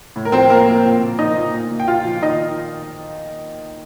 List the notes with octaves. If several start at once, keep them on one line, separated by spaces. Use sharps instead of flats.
A2
A#4
F3 C4 C5
F3 A#3 A#4
F3
A#2
A#2
F3 D#4 D#5
A#2
A#2
A#2
G5
A#2 F4 F5
F3
D#3 D#4 D#5